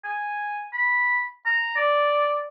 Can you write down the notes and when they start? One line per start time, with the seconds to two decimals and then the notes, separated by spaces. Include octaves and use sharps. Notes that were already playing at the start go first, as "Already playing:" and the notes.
0.05 G#5
0.73 B5
1.46 A#5
1.76 D5